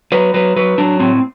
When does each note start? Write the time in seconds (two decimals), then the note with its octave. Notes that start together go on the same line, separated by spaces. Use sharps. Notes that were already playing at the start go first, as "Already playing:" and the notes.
0.12 F#3 B4
0.34 F#3 B4
0.56 F#3 B4
0.78 F#3 D4
1.00 A2 C4